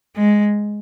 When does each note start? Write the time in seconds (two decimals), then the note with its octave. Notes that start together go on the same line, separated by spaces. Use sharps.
0.16 G#3